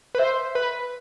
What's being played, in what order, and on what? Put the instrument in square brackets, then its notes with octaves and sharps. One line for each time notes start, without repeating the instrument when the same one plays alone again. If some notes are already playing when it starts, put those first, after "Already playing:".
[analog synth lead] B4
[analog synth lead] C5 [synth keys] E5
[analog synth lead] B4